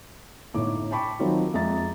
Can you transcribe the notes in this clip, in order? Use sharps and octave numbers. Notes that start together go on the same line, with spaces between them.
G1 A2 D#4 C#5 D6
G5 A5 B5 C#6 D6
D#3 F#3 C4 D#4 F4
F2 G#3 E5 A#5 A6